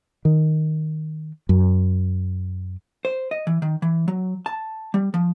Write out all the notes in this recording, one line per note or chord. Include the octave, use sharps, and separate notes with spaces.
D#3
F#2
C5
D#5
E3
D#3
E3
F#3
A5
G3
F3